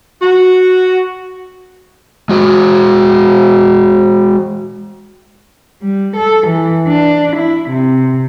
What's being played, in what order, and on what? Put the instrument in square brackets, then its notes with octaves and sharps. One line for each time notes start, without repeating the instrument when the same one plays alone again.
[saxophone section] F#4
[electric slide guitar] G#3 F#4
[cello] G3
A4
E3
D4
E4
C3